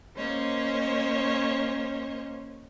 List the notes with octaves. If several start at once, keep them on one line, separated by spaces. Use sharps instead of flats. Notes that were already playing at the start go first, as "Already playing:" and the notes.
A#3 C#4 C5 C#5 D#5